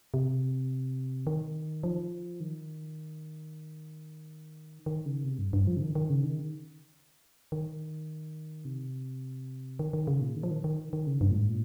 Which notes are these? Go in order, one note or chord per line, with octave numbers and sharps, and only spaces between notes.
C3
D#3
F3
D#3
D#3
C#3
C3
G2
G2
F3
C#3
D#3
D#3
C#3
D#3
D#3
C3
D#3
D#3
C#3
A#2
D#3
F3
D#3
D#3
D#3
C#3
G2
A#2
G#2
A#2